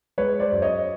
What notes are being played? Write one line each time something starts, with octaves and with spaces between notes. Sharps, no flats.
G#3 B4 C#5
C5 D5
F#2
C#5 D#5